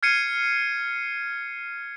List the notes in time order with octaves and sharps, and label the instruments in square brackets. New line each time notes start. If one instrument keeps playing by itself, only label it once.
[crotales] F6 G#6 C7 C#7 D#7